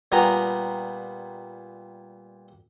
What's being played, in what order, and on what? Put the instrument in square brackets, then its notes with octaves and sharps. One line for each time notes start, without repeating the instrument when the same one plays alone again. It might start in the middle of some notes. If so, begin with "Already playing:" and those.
[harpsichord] A#2 G3 B3 G#5 A#5